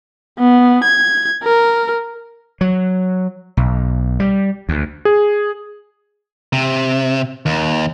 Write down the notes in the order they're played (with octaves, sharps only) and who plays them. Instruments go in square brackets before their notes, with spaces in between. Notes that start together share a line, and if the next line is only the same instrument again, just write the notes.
[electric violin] B3
G#6
A#4
[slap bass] F#3
B1
G3
D2
[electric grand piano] G#4
[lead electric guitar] C3
D#2